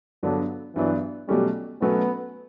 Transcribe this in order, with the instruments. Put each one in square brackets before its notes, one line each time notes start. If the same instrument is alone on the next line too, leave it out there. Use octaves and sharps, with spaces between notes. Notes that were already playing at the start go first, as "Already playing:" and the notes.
[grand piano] G2 F#3 B3 D4 [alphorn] D3
[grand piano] G2 F#3 B3 D4 [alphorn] E3
[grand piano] B2 F#3 A3 C#4 [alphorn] G3
[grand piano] B2 F#3 A3 C#4 [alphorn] B3